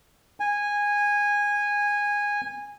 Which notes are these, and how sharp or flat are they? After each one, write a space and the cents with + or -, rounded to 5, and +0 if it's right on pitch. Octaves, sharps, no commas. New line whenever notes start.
G#5 -15